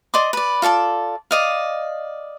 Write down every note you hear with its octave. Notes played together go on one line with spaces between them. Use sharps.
D5 D#5 C6 D6
B4 D5
F4 A4 D5 A5
D5 D#5 F5